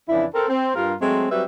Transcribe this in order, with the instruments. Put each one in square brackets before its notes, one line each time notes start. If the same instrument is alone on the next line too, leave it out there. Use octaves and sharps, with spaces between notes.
[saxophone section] F2 C#3 E3 D4 E4
C4 A4 A#4
C4
G2 F4 A#4
F#3 G#3 A3 C4
F#3 G3 C4 F#4 B4 E5